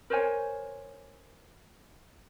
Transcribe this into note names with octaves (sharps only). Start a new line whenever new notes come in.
A#4 C5 C#5 G#5